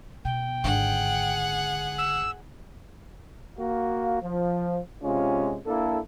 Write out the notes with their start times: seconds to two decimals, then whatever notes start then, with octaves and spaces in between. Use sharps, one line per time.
0.25 B2 G5
0.64 G#1 D3 G#4 F#5
1.98 E6
3.59 A#3 F#4 F5
4.23 F3
5.03 C3 G#3 C#4 F4
5.67 A#3 D4 E4 A4